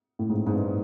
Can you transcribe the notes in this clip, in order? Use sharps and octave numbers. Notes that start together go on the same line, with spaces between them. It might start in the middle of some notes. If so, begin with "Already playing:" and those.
A2
G#2
G#2
G2